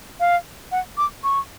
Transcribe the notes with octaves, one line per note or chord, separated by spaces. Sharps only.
F5
F#5
D6
C#6